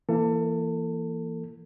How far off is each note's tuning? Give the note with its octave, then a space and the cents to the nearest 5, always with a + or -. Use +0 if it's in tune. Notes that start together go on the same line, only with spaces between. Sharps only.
E3 +20 A#3 +0 A4 +30